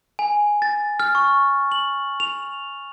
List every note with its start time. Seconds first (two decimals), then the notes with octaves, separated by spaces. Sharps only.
0.19 G#5
0.62 A6
1.00 F6
1.15 C#6
1.72 F#7
2.20 F7